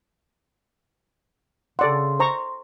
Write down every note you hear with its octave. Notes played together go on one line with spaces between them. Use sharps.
C#3 A4 D5 F#5 C6
C5 A#5 C#6